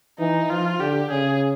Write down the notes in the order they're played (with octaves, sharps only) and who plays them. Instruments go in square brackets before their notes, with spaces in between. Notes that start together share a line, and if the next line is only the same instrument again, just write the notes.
[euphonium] E3 [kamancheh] D#4
[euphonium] F3 [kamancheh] F4
[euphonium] D3 [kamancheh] G4
[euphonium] C#3 [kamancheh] G#4